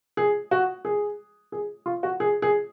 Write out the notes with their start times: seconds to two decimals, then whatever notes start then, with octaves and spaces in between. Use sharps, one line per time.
0.17 G#4
0.51 F#4
0.85 G#4
1.52 G#4
1.86 F4
2.03 F#4
2.20 G#4
2.42 G#4